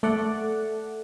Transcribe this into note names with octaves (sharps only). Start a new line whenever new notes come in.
A3 D5 F#5